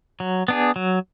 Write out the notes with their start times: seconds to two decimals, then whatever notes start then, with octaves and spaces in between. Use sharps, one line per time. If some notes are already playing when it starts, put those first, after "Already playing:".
0.20 F#3
0.48 B3 D4 G#4
0.76 F#3